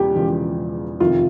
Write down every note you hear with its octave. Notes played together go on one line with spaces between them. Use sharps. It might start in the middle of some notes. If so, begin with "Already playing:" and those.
Already playing: E1 E2 C#3 F3 G4
E1 E2 C#3 F3
F2 C3 D#3 F4